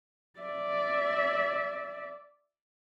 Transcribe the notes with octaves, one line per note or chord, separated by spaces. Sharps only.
D5 E5